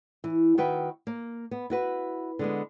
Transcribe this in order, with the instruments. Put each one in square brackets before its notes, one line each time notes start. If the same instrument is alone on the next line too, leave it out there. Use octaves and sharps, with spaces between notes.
[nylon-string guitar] E3
D#3 F#4 B4 E5 G5
A#3
B3
E4 F#4 B4
D3 G#3 B3